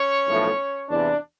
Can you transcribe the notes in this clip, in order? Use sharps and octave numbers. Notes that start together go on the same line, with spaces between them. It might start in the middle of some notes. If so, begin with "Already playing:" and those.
Already playing: C#4 C#5
B1 A2 F3 A3
E2 C3 E3 D4 D5